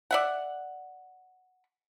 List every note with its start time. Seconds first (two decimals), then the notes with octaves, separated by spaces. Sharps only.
0.11 D5 E5 F#5